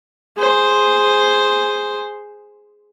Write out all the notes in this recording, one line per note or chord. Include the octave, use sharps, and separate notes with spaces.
G#4 C5